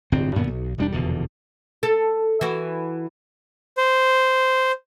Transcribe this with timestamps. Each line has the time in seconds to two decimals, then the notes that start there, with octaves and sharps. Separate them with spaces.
0.12 D1 G1 C3 C4
0.35 F#2 A#2 D3 B3
0.47 B1
0.78 E1 G3 D4
0.92 F1 E2 B2 D3
1.83 A4
2.41 E3 F#4
3.77 C5